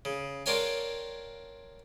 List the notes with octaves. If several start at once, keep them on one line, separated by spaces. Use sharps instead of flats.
C#3
D4 F4 A#4 C#5 G5 G#5